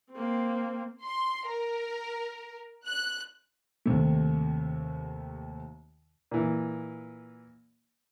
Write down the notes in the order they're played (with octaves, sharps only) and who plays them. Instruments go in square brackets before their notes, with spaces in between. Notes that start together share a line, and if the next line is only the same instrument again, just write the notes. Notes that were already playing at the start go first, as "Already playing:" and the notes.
[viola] A#3 C4
[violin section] C6
A#4
F#6
[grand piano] D#2 C3 A3
[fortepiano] A#2 E3